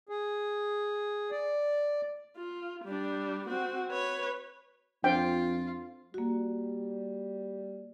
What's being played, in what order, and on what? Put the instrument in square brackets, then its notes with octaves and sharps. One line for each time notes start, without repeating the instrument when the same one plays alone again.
[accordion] G#4
D5
[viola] F4
G3 D4
C4 F#4
B4 C#5
[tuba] F2 [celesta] D4 C5 [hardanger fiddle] F4 [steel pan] G5
[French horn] G3 [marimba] A#3 F#4